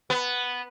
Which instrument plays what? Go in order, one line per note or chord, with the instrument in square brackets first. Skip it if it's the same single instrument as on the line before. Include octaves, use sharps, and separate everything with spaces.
[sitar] B3